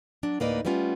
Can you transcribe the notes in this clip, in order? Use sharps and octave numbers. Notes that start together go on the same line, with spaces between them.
F#3 D4
D2 A2 A#3 D#4 B4 D5
G3 A3 B3 C#4 F4